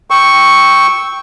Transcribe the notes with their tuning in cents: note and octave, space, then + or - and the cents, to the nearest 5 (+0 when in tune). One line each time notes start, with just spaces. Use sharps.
G5 +0 C#6 +0 E6 -15